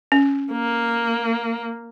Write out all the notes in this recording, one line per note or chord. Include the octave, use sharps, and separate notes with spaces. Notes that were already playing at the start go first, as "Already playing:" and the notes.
C#4
A#3